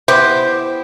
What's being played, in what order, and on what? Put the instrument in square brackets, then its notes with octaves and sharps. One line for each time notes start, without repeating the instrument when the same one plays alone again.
[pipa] B3 G4 [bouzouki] E4 C5